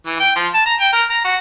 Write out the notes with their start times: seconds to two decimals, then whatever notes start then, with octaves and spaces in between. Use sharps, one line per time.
0.07 E3
0.20 G5
0.36 F3
0.54 A5
0.66 A#5
0.80 G5
0.93 A#4
1.10 A#5
1.25 F#4